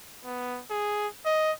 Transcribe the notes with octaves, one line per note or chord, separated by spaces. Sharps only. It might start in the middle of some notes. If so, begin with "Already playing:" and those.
B3
G#4
D#5